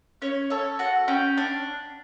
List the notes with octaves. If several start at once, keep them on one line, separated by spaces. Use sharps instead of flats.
C#4 C#5
A4 C#5
F#4 F#5
C#4 G5
D4